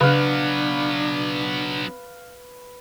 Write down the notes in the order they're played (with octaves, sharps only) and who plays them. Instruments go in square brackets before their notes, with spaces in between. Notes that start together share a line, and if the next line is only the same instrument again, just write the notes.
[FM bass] C#3 [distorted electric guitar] F#3 B3 [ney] D4 [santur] B4 F5